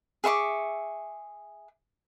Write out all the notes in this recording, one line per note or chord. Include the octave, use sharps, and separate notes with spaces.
G#4 E5 C#6 D6